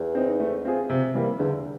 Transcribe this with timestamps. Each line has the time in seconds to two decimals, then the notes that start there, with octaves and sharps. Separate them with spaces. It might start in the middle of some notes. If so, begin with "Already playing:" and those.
Already playing: E2
0.15 C4 D#4
0.40 A3
0.65 C4 F4 G#4
0.89 C3
1.14 E3 G3 A#3
1.39 E2 D3